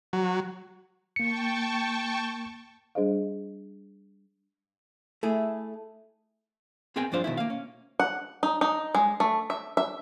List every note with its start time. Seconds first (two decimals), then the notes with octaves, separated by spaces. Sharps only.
0.13 F#3
1.16 A#3 G5 A5 C#6 C#7
2.95 G3 D4 G#4 C5 D#5 F5
5.23 A3 E4 G#4
6.96 B3 C4 G#4 A#4 G5 G#5
7.12 G2 F3 D4 C5 F5
7.24 B2 D#3 E4
7.37 A#3 F5
7.50 C#4
8.00 F#5
8.43 D#4
8.61 D#4
8.95 G#3
9.20 A3
9.50 E5
9.77 E5